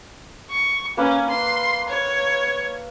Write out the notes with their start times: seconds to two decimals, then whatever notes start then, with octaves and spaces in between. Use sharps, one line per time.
0.51 C#6
0.97 A#3 C#4 B4
1.30 C6
1.88 C#5